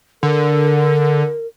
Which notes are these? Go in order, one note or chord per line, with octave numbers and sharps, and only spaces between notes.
D3 A#4